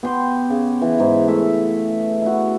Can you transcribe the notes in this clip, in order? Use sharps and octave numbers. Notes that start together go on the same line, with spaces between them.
B3 G4 C6
C#3
E3
G#2
A3 E5
E4 F#4